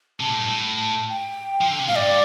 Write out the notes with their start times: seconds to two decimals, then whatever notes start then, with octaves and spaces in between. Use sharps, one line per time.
0.20 C3 A5
0.29 A2
0.39 G2
0.48 A2
1.09 G5
1.61 F3
1.70 D3
1.79 C3
1.88 A2 F5
1.96 G2 D5